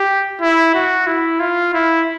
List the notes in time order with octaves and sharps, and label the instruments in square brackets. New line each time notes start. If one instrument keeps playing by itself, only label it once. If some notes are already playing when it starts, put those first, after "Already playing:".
Already playing: [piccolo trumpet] G4
E4
F#4
E4
F4
E4